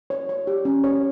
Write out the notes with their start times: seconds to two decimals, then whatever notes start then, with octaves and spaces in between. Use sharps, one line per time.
0.10 C#5
0.29 C#5
0.47 G4
0.65 C#4
0.84 C#5